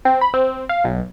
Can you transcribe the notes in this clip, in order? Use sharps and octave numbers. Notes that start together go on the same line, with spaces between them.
C4
B5
C4
F5
B1